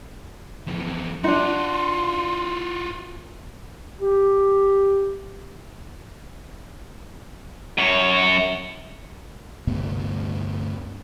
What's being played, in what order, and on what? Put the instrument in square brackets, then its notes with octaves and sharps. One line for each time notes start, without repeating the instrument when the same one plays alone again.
[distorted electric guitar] F2 E3
[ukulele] D4 D#4 [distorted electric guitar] F4 F#4 [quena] C6
[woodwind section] G4
[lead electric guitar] F#2 C#5
[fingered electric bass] D2 G2 C3 B3